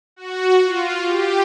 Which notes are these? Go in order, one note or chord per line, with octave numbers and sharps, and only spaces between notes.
F#4
F4
G4